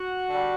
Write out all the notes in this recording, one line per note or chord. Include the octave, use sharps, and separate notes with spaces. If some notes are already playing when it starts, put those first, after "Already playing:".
Already playing: F#4
D3 G3